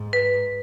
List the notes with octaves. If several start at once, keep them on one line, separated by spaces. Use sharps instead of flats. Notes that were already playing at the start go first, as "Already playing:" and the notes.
Already playing: G#2
B4